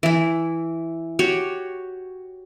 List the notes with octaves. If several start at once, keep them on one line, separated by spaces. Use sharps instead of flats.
E3 E4
F#4 G4 C#5